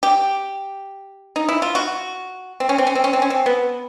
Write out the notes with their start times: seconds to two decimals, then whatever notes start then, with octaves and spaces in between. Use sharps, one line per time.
0.03 G4
1.36 D#4
1.49 E4
1.62 F4
1.75 F#4
2.60 C4
2.69 C#4
2.78 C4
2.87 C#4
2.95 C4
3.04 C#4
3.13 C4
3.22 C#4
3.30 C4
3.46 B3